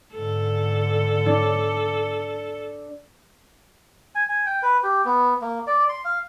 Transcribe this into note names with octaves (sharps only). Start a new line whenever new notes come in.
G#2 D3 A4
D4
G#5
G#5
G5
B4
G4
B3
A#3
D5
C6
F5